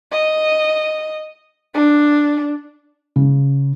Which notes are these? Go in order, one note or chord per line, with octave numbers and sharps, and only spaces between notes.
D#5
D4
C#3